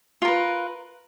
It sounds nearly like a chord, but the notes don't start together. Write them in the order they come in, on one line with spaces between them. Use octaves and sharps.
F4 A#4 B4